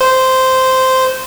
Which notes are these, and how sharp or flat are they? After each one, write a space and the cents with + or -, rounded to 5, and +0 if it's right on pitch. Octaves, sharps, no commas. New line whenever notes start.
C5 -10